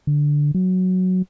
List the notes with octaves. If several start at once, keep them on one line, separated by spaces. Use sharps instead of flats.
D3
F#3